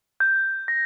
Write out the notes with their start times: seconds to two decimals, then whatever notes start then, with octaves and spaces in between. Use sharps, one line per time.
0.20 G6
0.68 A#6